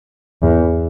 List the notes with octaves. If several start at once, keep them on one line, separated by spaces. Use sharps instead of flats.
E2